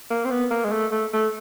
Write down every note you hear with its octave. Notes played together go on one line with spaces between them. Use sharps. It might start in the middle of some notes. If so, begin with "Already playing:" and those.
A#3
C4
B3
A#3
G#3
A3
A3
A3